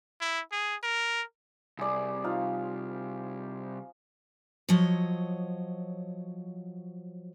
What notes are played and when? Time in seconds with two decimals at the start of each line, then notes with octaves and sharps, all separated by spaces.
0.21 E4
0.52 G#4
0.83 A#4
1.79 C2 G#4 D5
2.24 F3 D#4 F5
4.69 F3 F#3 C#5 D#5